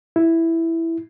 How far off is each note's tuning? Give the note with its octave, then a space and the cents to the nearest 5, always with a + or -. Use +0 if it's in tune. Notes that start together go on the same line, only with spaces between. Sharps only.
E4 +0